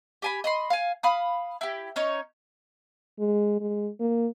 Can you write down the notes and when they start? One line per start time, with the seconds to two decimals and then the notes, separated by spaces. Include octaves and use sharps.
0.22 G4 G#5 B5
0.44 D#5 B5 C6
0.70 F5 G#5
1.03 F5 B5 D#6
1.61 E4 G4
1.96 C#4 D#4 C#5
3.19 G#3
3.61 G#3
4.00 A#3